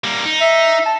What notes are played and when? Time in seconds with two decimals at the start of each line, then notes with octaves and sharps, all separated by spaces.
0.04 G3 A#3
0.25 D#4
0.41 E5
0.85 A5